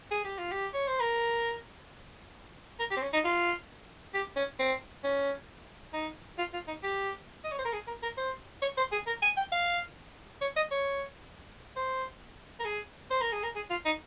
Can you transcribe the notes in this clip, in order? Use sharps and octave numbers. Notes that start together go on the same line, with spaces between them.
G#4
G4
F4
G4
C#5
C5
A#4
A#4
G4
C4
C#4
D#4
F4
G4
C#4
C4
C#4
D#4
F4
F4
D#4
G4
D#5
C#5
C5
A#4
G#4
A#4
A#4
C5
C#5
C5
G#4
A#4
G#5
G5
F5
C#5
D#5
C#5
C5
A#4
G#4
C5
A#4
G#4
A#4
G#4
F4
D#4